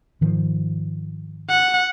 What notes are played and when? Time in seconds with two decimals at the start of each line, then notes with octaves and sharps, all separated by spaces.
0.21 G#2 D#3 F3
1.50 F#5